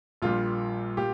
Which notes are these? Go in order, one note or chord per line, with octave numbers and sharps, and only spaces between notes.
A#1 A#2 G3 F4
A#2 G4